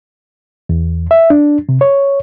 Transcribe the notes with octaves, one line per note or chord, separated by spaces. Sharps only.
E2
E5
D4
C3
C#5